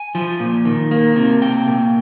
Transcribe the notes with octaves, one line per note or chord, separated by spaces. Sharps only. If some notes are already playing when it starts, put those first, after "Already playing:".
Already playing: G#5
F3
A#2
D#3
A#3
C3
A#3 G5
A#2